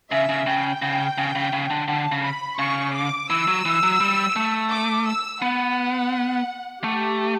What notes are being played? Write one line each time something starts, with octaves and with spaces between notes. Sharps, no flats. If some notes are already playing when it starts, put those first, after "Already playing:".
C#3 E5
C#3
C#3 G5
C#3
C#3
C#3
C#3
D3
D3 A5
C#3
B5
C#3 C#6
D6
E3 E6
F#3
E3
F#3
G3
A3
D6
E6
B3 F#5
A3 G4